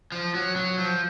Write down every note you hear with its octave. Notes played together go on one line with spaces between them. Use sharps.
F3
F#3
F#3
F3